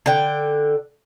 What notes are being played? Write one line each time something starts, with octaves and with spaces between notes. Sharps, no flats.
D3 G5